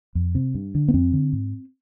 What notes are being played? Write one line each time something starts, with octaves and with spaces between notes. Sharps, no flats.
F2
C3
G2
D3
B3
F2 C4
D3
G#2